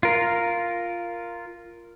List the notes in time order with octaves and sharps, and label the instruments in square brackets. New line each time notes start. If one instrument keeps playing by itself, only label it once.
[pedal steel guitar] F4 A#4